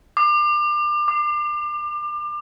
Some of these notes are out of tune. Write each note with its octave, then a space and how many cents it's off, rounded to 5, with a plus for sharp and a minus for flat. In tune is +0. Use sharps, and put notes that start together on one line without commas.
D6 +30
D6 +15